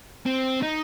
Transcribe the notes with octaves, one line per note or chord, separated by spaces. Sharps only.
C4
D#4